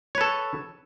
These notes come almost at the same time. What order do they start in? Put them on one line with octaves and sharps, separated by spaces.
C#5 B4 A4